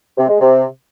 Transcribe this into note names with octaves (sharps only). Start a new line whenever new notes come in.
C3
G#3
C3